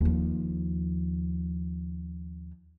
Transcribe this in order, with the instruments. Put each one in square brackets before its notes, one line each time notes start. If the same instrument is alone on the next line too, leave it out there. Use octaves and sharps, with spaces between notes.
[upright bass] D#2 F3